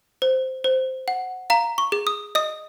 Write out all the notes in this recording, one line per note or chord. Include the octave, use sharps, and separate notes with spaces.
C5
C5
F#5
F5 A#5
C#6
G#4
D#6
D#5 D#6